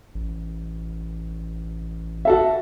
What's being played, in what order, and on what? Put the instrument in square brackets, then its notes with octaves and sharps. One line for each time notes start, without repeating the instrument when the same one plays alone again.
[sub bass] A1
[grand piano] F#4 A4 E5